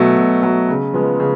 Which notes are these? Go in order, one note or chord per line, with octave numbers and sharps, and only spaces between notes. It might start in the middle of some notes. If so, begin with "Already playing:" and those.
Already playing: B2 F#3 A3
B2
F#3 A3
C#3
F3 G#3 B3
C#3